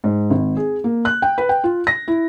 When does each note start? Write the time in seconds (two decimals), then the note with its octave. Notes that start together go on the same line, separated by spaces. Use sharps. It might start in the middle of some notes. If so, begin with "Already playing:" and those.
0.04 G#2
0.30 G#1
0.57 G#4
0.84 A#3
1.05 F#6
1.22 G5
1.38 B4
1.49 G5
1.64 F4
1.87 A#6
2.08 E4